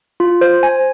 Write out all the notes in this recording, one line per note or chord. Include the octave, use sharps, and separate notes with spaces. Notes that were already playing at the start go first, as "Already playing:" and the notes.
F4
C5
G#5